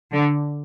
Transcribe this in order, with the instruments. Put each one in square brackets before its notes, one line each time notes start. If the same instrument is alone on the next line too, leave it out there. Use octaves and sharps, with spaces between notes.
[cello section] D3